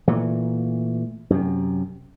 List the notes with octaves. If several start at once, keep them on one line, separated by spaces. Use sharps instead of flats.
A#2 E3 A3
F#2 C3